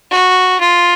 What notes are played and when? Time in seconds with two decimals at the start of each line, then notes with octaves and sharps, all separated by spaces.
0.11 F#4
0.60 F4